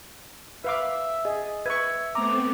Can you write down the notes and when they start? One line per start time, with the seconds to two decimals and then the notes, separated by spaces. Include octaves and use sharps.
0.64 B4 E5 F5 D6
1.25 G#4 D#5
1.66 B4 E5 C#6 G#6
2.15 A3 B3 C4 A#5 D6